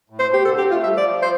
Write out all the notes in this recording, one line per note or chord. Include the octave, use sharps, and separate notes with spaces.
A2
C5
B2
G4
D3 A4
C4 G4
A3 F4
G3 E5
F3 D5
C5